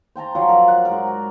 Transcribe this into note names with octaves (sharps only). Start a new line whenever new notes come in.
C5 G5 A5 A#5
F3 F#3 F4
A#4 D5
F#5
G#2 A#4
F#4